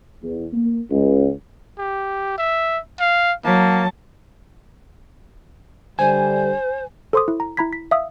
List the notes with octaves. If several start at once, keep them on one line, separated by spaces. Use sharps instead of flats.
E2
A#3
C#2
G4
E5
F5
F#3 A#3 A5
D3 G3 C5 G#5
A4 C5 C6 D6 D#6
E4
A#5
E4 A#5 B5 G#6 B6
B6
E5 F5 D#6 E6